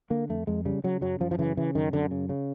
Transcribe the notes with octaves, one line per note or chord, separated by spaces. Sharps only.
D3 A#3
F2 A3
F2 G#3
C#3 G3
C#3 F#3
F#2 F#3
F#2 F3
F3
C#3 E3
C#3 E3
F#2 D#3
F#2 D3
C#3
C#3